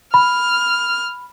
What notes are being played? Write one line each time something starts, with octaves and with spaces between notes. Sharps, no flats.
B5 F6